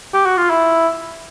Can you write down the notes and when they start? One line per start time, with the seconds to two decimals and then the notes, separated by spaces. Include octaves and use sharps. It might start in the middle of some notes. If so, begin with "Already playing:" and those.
0.13 G4
0.25 F#4
0.37 F4
0.50 E4